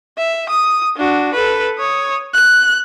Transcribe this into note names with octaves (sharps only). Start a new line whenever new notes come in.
E5
D#6
D4 F#4
A4 B4
C#5 D#6
F#6